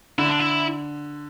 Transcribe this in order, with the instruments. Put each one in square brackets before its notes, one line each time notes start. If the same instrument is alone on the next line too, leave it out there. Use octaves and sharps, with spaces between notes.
[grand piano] D3 [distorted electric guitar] E4
[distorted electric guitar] D4
E4